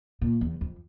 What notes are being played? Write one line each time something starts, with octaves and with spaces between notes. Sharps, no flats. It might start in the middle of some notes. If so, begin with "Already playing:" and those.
A#2
E2
F2